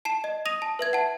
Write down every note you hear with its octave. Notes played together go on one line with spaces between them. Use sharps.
A5 C7 E7
D#5
D#6 A#6 D#7 F7
A5
B4 E5 G#6
F#5 A5